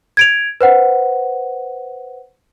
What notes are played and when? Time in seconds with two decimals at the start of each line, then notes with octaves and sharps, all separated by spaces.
0.17 G#6 D7 F7
0.61 B4 C5 F#5